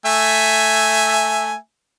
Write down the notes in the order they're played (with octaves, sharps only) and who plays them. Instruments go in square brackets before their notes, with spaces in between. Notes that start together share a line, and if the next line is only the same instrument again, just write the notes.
[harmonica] A3 E5 G#5